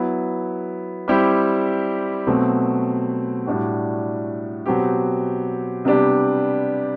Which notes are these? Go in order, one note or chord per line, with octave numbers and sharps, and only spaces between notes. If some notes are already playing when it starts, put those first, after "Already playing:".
Already playing: F#3 B3 E4
G3 C4 E4 G4
B2 F#3 A3 C4
A2 G3 D4 F#4
B2 F#3 C4 G4
C3 G3 B3 D4 G4